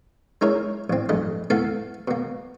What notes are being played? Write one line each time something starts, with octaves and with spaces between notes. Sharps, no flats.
G#3 D#4 E4 A#4 C#5
A1 C4
A#1 G2 A3 D#5
A3 B3 E4 A4 E5 F5
B2 A#3